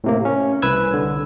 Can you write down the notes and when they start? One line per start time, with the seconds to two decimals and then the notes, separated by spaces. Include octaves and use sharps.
0.04 A2 C3 A#3
0.25 C#4
0.62 C2 B4 E6 G#6
0.94 D3